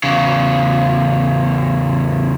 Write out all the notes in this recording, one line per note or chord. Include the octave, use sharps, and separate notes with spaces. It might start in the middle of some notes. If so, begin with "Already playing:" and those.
E2 C#3